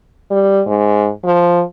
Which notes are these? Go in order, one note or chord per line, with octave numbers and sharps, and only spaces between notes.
G3
G#2
F3